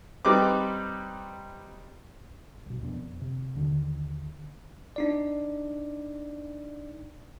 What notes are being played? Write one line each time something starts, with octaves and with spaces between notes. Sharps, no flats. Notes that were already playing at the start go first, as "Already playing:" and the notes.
G3 C4 D#4 B4 D6
C2 B2
F2 B3 D4
C3
D#2 D3 D#3
D4 D#4 D5